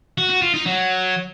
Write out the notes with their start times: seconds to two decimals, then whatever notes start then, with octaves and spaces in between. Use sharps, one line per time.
0.18 F#4
0.30 F#4
0.42 F4
0.54 D#4
0.66 F#3